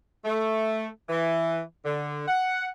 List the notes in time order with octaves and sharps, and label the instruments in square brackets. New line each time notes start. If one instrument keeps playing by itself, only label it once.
[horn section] A3
E3
D3
F#5